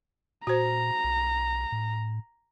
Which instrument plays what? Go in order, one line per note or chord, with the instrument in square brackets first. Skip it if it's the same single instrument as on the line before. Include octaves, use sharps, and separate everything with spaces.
[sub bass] A#2 [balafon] F#4 C5 [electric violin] A#5
[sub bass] B1
A2